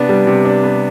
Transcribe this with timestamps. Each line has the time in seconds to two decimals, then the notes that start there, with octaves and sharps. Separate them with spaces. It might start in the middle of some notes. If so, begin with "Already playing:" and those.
Already playing: C3 B3 D4
0.09 G3
0.27 C3
0.45 D4
0.64 B3